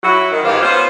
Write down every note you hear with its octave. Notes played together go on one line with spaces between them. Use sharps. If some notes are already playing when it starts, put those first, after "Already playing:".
F#3 E4 F#4
D#3
G#2 E3 F4 G4 C5 F5
B3 C#4 F4 C5